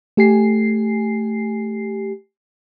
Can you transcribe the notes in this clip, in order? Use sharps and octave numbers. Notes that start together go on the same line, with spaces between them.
A3 G4 G#5 C7